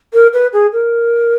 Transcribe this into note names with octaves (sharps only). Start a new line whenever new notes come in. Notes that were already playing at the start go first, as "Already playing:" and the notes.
A#4
B4
G#4
A#4